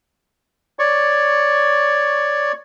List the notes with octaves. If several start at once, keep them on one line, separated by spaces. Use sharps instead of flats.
C#5 D5 C#6